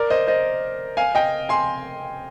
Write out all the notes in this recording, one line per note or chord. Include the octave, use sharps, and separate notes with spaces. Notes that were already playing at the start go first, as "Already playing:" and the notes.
Already playing: A#4 D5
C5 D#5
C5 D#5
F5 G#5
D#5 G5
G#5 C6